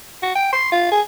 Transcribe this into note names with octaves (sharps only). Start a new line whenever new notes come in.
F#4
G5
C6
F4
G#4